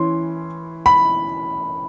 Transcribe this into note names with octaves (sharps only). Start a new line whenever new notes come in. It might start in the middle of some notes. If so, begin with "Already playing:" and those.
Already playing: E3 C#4 E4 C6
B5